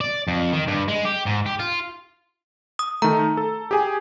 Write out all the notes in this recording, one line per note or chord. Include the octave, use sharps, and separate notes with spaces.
D5
F2
D#3
G2
G#3
G4
G#2
G4
F4
D#6
D#3 A3 A#5
A4
G4 G#4 G#5